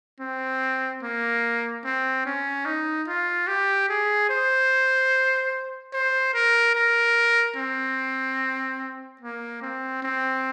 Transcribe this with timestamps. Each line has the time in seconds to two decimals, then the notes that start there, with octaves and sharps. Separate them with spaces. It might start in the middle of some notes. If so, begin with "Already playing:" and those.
0.20 C4
1.03 A#3
1.85 C4
2.26 C#4
2.66 D#4
3.08 F4
3.48 G4
3.89 G#4
4.30 C5
5.93 C5
6.34 A#4
6.75 A#4
7.56 C4
9.21 A#3
9.62 C4
10.03 C4